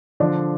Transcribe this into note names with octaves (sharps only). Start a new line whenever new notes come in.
D3 F3 D4